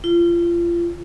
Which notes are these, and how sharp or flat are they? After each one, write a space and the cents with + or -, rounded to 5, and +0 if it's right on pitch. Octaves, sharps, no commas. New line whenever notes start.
F4 -30